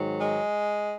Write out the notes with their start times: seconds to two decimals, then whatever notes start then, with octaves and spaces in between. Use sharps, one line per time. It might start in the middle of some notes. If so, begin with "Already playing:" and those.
Already playing: G#2 D#3 F#3
0.19 G#3